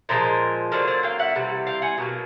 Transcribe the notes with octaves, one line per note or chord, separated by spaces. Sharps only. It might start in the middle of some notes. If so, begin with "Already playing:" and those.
A#2 F3 G#3 A#4 C5
D3 F#3 A#3 C5 D5
C5 D5
F5 G5
E5 F#5
C3 E3 G3 A#3
F5 G5
F#5 G#5
B2 F#3 A#3